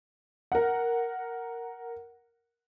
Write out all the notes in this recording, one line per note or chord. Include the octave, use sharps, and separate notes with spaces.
A#4 F#5